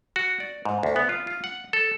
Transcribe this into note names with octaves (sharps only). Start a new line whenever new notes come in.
F#4
D5
G#2
D2
B3
F4
F4
F#5
A4